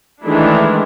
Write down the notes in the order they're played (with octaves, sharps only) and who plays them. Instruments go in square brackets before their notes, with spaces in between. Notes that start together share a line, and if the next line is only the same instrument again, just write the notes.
[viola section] D#3 E3 G#3 A3 D4 E4